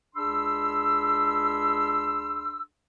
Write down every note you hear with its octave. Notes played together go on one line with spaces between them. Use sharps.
C#2 D4 G#4 B5 C6 E6